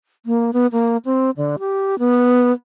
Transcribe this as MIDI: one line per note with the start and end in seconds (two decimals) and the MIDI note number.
0.26 0.51 58
0.53 0.67 59
0.72 0.97 58
1.05 1.30 60
1.37 1.56 50
1.59 1.99 67
1.99 2.52 59